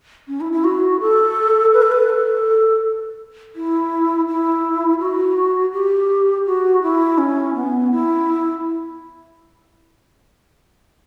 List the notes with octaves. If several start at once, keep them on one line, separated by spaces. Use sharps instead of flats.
C#4
E4
E4
F#4
A4
B4
A4
B4
A4
E4
E4
F#4
G4
F#4
E4
C#4
B3
E4